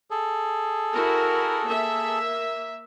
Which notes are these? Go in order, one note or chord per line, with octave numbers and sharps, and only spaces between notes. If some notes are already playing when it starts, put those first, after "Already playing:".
G#4 A4
E4 F#4 A#4
A#3 E5